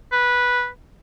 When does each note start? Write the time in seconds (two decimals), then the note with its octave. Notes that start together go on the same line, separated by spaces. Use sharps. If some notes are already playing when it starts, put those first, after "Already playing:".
0.12 B4